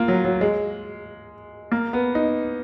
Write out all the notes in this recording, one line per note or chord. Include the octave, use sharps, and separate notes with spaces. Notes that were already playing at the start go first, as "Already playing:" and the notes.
Already playing: A#3 F4
F#3
F#3
G#3
A#3
B3
D#4